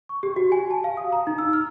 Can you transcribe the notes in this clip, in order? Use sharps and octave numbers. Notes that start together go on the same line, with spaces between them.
C#6
G4
F#4
G#5
A5
F5
D#6
A#5
D#4
E6
F6